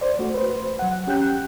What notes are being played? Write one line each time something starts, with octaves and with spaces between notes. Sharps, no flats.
C5 D5
A3 F#4
B4 C5
F#3 F#5
C#4 G4 G5 F#6 G6